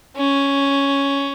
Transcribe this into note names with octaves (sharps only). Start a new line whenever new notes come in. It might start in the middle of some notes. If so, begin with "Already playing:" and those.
C#4